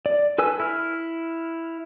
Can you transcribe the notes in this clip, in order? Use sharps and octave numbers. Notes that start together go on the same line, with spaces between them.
D5
A4 B4 G#5 E6
E4 F6